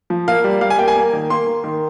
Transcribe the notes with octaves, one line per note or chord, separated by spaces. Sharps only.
F3
A#3 F5
G3
G3 F5
G#5
A#3 G5
G#5
A#3
D#3
A#3 C6
A#3
D#3